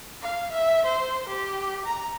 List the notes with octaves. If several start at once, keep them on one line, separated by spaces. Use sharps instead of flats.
F5
E5
C5
G4
A#5